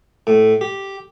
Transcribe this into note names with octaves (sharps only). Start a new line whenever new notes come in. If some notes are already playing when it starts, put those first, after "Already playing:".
A2
G4